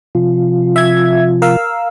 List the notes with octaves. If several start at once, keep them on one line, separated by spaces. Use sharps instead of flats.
C3 F3 F4
E5 G#6
A#4 F5 E6